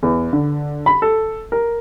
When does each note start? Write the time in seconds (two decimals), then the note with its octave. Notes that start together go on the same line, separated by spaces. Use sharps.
0.03 E2
0.33 D3
0.86 B5
1.02 A4
1.52 A#4